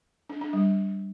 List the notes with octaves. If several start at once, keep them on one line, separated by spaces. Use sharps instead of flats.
D4
D4
G3